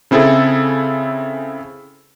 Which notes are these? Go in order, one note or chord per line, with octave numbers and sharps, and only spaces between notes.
C#3 C4 E4 G#4 A4